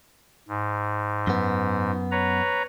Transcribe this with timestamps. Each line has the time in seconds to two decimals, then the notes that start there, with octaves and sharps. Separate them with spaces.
0.48 G#2
1.27 F#2 B3
2.11 B4 C#5 A#5